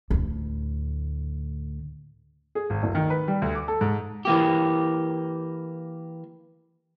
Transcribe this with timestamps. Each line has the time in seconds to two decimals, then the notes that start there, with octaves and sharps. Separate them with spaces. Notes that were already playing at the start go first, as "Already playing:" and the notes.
0.10 D2 A2
2.55 G#4
2.70 G#1
2.83 D1
2.95 D#3
3.10 B4
3.28 G3
3.42 D2
3.55 D6
3.68 A4
3.81 G#2
4.25 E3 A#3 G4